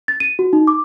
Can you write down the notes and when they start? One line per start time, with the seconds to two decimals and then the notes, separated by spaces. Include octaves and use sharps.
0.08 A6
0.20 D#7
0.39 F#4
0.53 D#4
0.67 D6